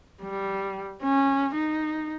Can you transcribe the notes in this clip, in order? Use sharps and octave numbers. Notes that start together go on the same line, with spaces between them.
G3
C#4
D#4